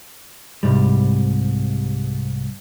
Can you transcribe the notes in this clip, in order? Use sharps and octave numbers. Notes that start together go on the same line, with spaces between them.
C2 G#2 G3